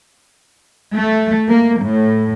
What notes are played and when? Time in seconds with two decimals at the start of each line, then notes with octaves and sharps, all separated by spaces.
0.95 A3
1.48 A#3
1.81 A2